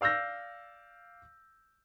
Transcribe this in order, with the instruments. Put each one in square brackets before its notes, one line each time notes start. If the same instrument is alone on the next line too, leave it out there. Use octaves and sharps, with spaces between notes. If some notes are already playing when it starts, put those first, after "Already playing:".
[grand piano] D5 F5 E6 G6 A#6